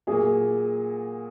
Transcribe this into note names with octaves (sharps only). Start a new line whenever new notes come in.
A#2 F#3 A#3 G#4